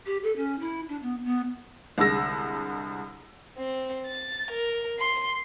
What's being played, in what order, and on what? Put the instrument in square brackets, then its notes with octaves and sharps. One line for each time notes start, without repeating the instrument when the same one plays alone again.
[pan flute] G4
A4
C#4
E4
D4
B3
B3
[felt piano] C2 D3 G#3 E6 A#6
[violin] C4
A6
A#4
C6